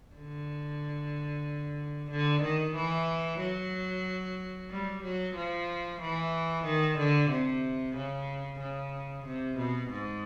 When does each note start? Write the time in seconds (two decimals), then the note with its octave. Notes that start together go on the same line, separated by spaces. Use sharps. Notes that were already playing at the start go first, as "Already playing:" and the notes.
0.15 D3
2.11 D3
2.43 D#3
2.75 E3
3.40 F#3
4.70 G3
5.03 F#3
5.35 F3
6.01 E3
6.65 D#3
6.98 D3
7.30 C3
7.96 C#3
8.60 C#3
9.26 C3
9.58 B2
9.90 G#2